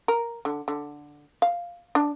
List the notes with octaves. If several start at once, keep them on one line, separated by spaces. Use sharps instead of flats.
A#4
D3
D3
F5
D4